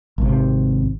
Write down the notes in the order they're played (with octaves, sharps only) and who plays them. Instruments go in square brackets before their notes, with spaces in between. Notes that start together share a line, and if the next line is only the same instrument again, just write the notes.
[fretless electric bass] G#1 C3